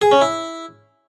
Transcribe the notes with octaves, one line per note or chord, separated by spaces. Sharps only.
G#4
C#4
E4